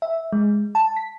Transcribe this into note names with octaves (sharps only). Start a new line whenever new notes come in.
E5
G#3
A5
B6